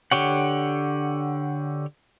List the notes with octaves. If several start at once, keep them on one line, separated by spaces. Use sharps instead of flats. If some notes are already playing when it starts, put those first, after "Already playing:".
D3 G4 C#5 F#5